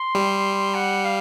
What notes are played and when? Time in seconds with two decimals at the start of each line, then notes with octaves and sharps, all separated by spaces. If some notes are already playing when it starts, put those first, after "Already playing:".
Already playing: C6
0.15 G3
0.74 F#5
1.05 F5